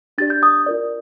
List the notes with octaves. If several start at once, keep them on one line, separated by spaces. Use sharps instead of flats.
D4 G4 D5 A6
G6
D#6
F4 A#4 D5